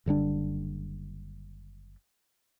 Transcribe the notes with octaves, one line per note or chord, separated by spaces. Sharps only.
F#1 D3 G3 D4